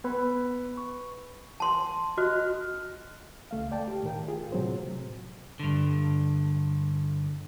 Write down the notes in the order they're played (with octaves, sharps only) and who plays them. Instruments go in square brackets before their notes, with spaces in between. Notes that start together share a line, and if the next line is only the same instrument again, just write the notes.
[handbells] B3 B4 B5
C#6
[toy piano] A5 C6
[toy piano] F#4 [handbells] D#5 F6 F#6
[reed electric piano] C#2 A3 F5
D5 G5 A5
G4
A2 D#3 A#4 G5
F4 G#4
A2 C3 F#3 C4 C5
[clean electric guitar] G2 D3